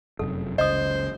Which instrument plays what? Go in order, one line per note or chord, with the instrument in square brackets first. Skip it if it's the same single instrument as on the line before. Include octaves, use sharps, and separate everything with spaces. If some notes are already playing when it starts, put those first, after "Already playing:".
[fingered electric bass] F1 F#2 C3 [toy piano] A4
[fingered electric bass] F#1 C#2 C#3 [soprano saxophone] C5 [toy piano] D#5 D#6